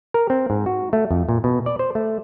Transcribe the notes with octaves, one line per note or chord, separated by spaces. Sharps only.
A#4
C4
G#2
F#4
A3
F2
A#2
B2
D5
C5
A3